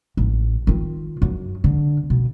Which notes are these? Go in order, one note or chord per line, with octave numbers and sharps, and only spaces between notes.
A1
D#3 F4
F#2
D3
B2